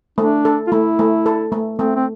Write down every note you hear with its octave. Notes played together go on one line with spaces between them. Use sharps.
A3 D4
A4
F4
A3 E4
A3
A4
A3
A3 C4
C4